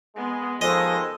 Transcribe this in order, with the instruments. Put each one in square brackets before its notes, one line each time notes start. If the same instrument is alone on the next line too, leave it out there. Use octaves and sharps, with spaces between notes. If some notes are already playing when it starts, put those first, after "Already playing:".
[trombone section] G#3 [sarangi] B3
[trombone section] D#3 G#3 [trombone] F3 [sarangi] A4 [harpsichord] D#5